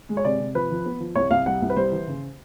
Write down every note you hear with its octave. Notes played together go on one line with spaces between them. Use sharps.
G#3
C#5
C3 D5
C3
F3 B4
F3
B3
F3
C2 C#5
C2 F5
G3 F#5
C2
B4
G3 C5
E3
C#3